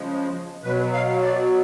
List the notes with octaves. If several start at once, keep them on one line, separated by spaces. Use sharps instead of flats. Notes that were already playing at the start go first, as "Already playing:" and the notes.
Already playing: C#3 F3 G#3
B2 F#3 B4
F5
D5